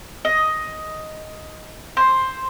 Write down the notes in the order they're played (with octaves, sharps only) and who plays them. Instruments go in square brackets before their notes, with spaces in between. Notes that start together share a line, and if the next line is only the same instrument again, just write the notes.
[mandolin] D#5
C5